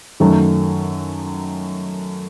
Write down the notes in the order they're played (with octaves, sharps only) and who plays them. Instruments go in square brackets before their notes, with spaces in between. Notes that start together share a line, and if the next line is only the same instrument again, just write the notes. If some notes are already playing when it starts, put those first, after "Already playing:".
[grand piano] F#2 D#3 F#3 A3